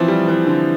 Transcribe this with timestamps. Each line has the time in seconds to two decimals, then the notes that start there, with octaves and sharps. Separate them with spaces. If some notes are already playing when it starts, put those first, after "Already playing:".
Already playing: E3 F3 C4
0.08 G3
0.28 E3
0.47 D3